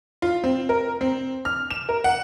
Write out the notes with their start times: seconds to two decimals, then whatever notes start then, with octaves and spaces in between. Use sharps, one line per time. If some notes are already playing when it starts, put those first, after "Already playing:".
0.22 F4
0.44 C4
0.69 A#4
1.01 C4
1.45 F6
1.70 E7
1.89 A#4
2.04 F#5